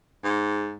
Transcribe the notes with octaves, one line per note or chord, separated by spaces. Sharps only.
G#2